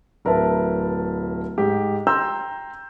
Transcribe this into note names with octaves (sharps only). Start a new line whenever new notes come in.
D1 A#4 B4 E5 A5
G#2 G4
G5 A#5 C6 E6 G6